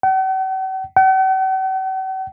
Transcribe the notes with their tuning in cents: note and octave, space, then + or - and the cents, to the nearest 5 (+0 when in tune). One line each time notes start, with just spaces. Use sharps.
F#5 +45
F#5 +45